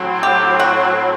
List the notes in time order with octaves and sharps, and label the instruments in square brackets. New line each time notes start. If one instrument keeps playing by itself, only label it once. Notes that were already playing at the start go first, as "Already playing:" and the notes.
Already playing: [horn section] A2 F#3 C4
[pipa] G4
F#4